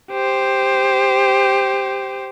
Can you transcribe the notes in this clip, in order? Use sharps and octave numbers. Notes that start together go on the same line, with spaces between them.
G4 C5